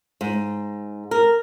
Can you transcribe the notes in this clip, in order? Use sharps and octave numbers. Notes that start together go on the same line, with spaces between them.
G#2
A#4